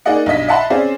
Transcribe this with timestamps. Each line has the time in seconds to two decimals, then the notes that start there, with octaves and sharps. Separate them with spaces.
0.06 A#3 D#4 G#4 D5 D#5 F#5
0.26 B1 G2 D#5 B6
0.48 D#5 E5 F#5 A5 B5 C6
0.70 C4 C#4 G#4 C5 D5